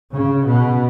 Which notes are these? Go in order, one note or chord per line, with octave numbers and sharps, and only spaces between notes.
C#3
B2